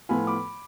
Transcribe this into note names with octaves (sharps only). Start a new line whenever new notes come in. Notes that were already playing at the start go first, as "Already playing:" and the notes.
A2 F3 B3 F4 G#5 B5
B5 D6